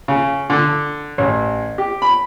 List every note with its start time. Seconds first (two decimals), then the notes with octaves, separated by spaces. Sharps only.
0.08 C#3
0.50 D3
1.18 A1
1.78 G4
2.02 B5